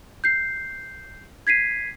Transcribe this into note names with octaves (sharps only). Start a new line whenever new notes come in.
G6 C7
G#6 B6 C7 D#7